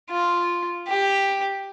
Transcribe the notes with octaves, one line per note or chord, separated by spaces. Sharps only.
F4
G4